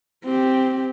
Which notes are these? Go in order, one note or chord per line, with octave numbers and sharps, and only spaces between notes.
C4 G4